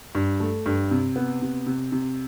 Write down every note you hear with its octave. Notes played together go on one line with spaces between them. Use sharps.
G2
A3
G2
C3
B3
C3
C3
C3